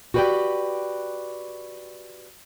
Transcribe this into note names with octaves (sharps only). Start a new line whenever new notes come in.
F#4 G4 B4 C#5 D5 G5